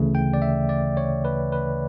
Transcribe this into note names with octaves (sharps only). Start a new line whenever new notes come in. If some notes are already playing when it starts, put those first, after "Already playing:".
Already playing: D2 C#3 E3 A3
G5
D5
E5
D5
C#5
B4
B4